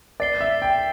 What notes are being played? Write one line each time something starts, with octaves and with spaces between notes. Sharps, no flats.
D5 A6 C7 G7
E5
G5